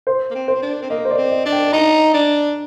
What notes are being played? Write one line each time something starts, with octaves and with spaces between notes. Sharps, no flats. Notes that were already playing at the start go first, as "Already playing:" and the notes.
C5
A#3
C4
C5
C4
D4
C4
A#3 D#5
C5
D5
C4
D#5
D4
G5
D#4 A#5
D4